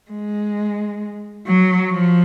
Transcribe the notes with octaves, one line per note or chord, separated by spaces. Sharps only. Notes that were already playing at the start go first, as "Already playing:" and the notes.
G#3
F#3
F3